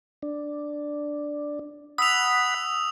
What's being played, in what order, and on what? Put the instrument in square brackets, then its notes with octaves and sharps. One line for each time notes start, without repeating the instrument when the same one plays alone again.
[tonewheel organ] D4
[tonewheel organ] F#5 B5 [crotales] D#6 E6 F7